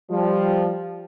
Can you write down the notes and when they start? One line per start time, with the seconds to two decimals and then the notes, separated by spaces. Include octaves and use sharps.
0.11 F3 G3